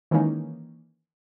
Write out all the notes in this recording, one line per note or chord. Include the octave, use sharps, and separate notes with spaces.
D#3 E3 G#3 A#3 C#4 D#4